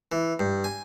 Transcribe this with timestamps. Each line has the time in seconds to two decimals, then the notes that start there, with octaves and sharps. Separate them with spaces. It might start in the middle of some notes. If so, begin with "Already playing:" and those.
0.12 E3
0.40 G2
0.64 G#5